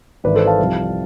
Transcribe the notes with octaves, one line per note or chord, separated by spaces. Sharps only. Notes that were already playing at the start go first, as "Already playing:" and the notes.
G#1 G#2 E3 B4 D5
A4 C5
F5 A5
C2 C3 F3